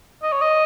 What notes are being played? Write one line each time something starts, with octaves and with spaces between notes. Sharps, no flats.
D#5
C#5
D#5